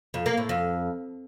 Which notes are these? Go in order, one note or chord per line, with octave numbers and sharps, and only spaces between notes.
F2
A#3
A2
F2